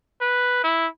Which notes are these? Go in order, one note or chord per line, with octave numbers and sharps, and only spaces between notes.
B4
E4